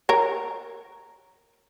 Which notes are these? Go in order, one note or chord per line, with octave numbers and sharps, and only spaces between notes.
A#4 C#5